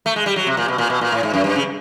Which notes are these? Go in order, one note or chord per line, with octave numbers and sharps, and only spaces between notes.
A3
G#3
G3
F#3
C3
A#2
B2
A#2
B2
A#2
A2
G#2
F#2
G2
C#3